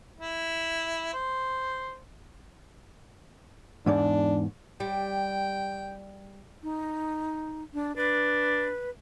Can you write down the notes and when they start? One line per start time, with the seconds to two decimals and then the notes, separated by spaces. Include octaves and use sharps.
0.18 E4
1.14 C5
3.86 E2 G#2 D4 D5
4.80 G3 G5
6.63 D#4
7.74 D4
7.96 D4 B4